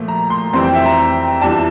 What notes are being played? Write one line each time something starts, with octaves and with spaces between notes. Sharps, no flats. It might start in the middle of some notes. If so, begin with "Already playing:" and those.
Already playing: A#2 F3 A3
A#5
C6
F2 E3 G3 C4 C6
G5
E5
A#5
E2 E3 G3 D4 F4 A5